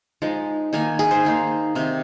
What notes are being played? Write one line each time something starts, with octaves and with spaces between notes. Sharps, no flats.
F3 G#3 D#4
D#3 A#3 D#4 G#5
G#4
C5
D#3 A#3 D#4
C3 D#3 C4